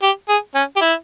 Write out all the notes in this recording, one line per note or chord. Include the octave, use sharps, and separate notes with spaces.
G4
G#4
C#4
G4
E4